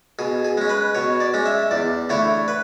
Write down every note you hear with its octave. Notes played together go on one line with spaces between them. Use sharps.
B2 G#4
G#4
G#3 C#4
B4
B2 C#5
D5
G#3 C#4
E5
E2 D5
D3 A3 E4 C#5
B4